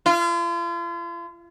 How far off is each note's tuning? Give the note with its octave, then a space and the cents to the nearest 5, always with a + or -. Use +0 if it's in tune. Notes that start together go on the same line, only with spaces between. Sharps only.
F4 -40